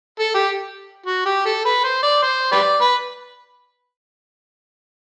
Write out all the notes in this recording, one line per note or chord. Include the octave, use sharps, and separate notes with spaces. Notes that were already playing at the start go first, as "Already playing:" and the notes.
A4
G4
F#4
G4
A4
B4
C5
D5
C5
G4 B4 D5
B4